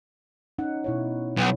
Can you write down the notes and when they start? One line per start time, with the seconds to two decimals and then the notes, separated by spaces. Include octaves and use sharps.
0.58 C#4 D#4 F#5
0.84 B2 E4 C#5
1.38 B1